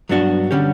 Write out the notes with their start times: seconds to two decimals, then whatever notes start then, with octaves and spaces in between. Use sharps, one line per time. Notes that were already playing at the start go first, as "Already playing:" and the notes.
0.09 G2 F#3 B3 D4 F#4
0.51 D3 G3 C#4 G4